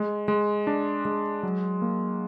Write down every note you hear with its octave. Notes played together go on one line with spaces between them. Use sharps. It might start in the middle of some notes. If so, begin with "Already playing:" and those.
Already playing: G#3
G#3
D4
G#3
F#3
A#3